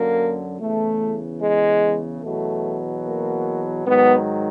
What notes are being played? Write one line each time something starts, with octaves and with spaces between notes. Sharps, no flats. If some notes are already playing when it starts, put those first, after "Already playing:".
Already playing: F#2 D3 F#3 A#3
E2 C#3 E3 A3
G#3
E2 B2 F#3 A3
A#3
G#2 D#3 F#3 B3